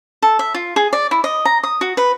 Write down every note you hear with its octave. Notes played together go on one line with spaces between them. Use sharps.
A4
E5
F4
G#4
D5
E4
D#5
A#5
D#6
F#4
B4